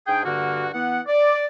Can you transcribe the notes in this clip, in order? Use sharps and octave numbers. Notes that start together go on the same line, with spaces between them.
G#2 D4 G#4 G5
G2 D3 A#3 F#4
E3 B3 F#5
D5